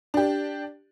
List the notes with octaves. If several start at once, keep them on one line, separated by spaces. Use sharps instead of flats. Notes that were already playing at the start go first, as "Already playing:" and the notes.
D4 G4